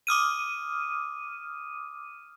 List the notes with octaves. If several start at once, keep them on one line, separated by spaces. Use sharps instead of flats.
D6 D#6 F6 D#7